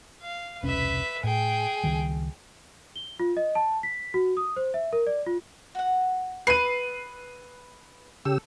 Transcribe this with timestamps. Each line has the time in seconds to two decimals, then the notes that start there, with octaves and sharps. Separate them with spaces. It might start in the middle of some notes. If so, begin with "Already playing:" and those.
0.22 F5
0.63 E1 C2 C#4 B4 E5
1.24 A2 G#4 G5
1.84 C#2 D#3 G3
2.96 G7
3.20 F4
3.37 D#5
3.55 A5
3.83 B6
4.14 F#4
4.37 D#6
4.56 C5
4.74 E5
4.93 A#4
5.07 D5
5.26 F4
5.75 F#4 F#5
6.47 B4 C7 D#7
8.25 C#3 G4 A4 E6